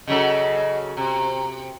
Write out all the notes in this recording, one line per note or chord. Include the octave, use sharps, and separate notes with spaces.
C#3 F#3 A4 D#5
C3 A#5